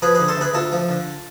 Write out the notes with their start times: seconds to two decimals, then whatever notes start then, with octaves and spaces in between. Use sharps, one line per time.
0.02 F3 G#4 B4
0.15 D3 G#4 B4
0.28 A4 C5
0.37 D2 G#4 B4
0.54 D2 F4 A4
0.72 F3
0.89 D3